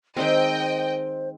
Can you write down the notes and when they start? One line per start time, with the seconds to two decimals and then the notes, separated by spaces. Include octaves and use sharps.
0.17 D#3 G#3 C4 C5 D#5 G5